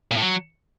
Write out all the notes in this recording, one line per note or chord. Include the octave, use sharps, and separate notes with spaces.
A#2
A2
F#3